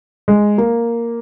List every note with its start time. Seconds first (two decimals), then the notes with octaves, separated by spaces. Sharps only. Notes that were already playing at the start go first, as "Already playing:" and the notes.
0.28 G#3
0.58 A#3